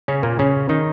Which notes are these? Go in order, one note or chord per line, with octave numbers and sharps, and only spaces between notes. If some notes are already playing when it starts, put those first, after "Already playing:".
C#3 C#4
A#2 A#3
C#3 C#4
D#3 D#4